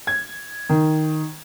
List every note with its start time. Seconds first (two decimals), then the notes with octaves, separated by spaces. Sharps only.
0.07 G#6
0.69 D#3